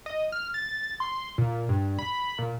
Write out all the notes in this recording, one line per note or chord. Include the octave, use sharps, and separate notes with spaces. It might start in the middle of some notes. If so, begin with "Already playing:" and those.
D#5
F6
A6
C6
A#2
G2
B5
A#2